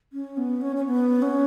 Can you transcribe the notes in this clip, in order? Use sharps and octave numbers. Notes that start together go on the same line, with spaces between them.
C#4
B3
C#4
C#4
B3
C#4